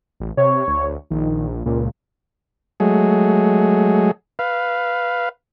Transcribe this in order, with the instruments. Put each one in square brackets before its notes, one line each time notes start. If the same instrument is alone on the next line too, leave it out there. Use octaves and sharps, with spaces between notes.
[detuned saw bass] A1
[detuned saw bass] C3 [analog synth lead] C#5
[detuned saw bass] D2
[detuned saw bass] A#1 [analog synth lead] D#3
[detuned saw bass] C#2 [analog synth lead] A#2
[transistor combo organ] F#3 G#3 A3 G#4
B4 F5